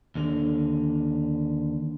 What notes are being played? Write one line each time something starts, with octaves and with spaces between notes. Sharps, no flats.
D#2 D3